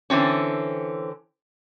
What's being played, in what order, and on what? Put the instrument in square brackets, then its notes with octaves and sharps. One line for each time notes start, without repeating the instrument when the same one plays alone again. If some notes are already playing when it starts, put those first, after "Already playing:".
[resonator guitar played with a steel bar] D3 E3 C4 C#4